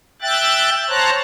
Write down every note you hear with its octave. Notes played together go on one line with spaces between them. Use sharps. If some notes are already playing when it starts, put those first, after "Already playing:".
E5 G5 F#6 A6
C5 C#5 A5 A#5 F#6